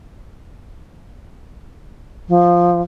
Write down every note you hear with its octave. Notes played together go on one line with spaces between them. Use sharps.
F3